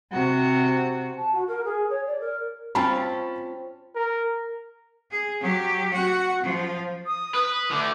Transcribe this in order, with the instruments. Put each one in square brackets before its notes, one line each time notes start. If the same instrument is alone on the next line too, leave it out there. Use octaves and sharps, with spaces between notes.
[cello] C3 F#4
[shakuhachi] A5
F#4
A#4
G#4
C#5
D5
A#4
[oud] C4 C#4 F4 [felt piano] A5 B5
[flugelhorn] A#4
[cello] G#4
F#3 G4
F#4 F#5
F3
[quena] D#6
[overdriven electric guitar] B4
[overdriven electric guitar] D3 A3 [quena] D6